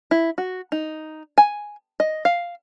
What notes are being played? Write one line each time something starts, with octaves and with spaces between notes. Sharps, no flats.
E4
F#4
D#4
G#5
D#5
F5